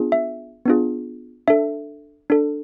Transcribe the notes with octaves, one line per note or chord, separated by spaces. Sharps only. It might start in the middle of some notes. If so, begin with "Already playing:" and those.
Already playing: B3 D4 F4 G#4
E5
B3 D4 F4 G#4
D4 A4 E5
D4 A4